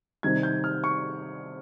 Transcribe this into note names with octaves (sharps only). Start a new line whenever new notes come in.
C3 D#3 G3 G#6
G6
F6
C#6